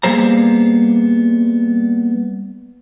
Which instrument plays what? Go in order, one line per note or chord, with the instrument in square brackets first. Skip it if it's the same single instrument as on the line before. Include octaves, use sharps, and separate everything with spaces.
[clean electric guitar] G3 A#3 B3 G#4 C5 A#5